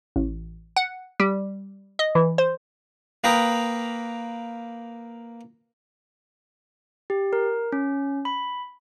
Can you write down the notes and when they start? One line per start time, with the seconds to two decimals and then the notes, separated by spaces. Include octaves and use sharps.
0.16 A1
0.77 F#5
1.20 G3
1.99 D#5
2.15 E3
2.38 C5
3.24 A#3 B4 G5 A#5 D#6
7.10 G4
7.33 A#4
7.72 C#4
8.25 B5